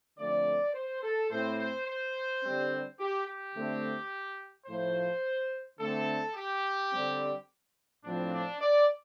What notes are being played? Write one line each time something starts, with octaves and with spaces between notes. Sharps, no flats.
D3 F3 A3 C4 D5
C5
A4
A2 A3 C4 C5
C5
C5
D3 G3 C4
G4
G4
D3 A3 C4
A2 F3 A3 C5
D3 A3 C4 A4
G4
D3 G3 C4
A2 F3 C4 D4
D4
D5